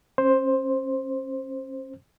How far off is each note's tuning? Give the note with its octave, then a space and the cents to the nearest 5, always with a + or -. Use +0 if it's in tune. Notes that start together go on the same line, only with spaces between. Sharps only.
C#4 -35 C5 +10